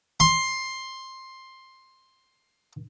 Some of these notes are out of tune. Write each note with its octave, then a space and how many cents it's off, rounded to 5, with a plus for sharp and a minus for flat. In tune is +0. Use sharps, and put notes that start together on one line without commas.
C6 +10